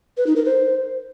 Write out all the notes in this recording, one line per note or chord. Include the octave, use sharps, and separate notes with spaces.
B4
D#4
A#4
C5